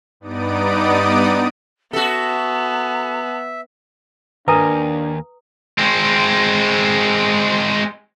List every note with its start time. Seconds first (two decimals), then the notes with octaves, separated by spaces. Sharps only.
0.20 G2 B3 D#4 D5 D#6 D7
1.93 B3 F#4 A4 E5 A5
4.48 D#2 D4 A#4 B4 G#5 A#5 D#6
5.78 G#3 C4